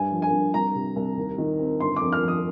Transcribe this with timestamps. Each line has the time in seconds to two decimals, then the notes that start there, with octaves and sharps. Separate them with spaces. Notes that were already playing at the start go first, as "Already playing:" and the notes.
Already playing: G2 G#5
0.12 F3
0.22 G#5
0.32 G2
0.54 C2 A#5
0.75 C3
0.96 C2
1.17 D#2
1.38 D#3
1.59 C4
1.80 G1 C6
1.96 F2 D6
2.12 F6
2.23 F3
2.28 D#6